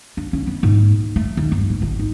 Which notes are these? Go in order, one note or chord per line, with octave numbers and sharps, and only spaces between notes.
D4
C#4
B3
G#2
D2
A3
D#2
G2
G#2
G#1
D#4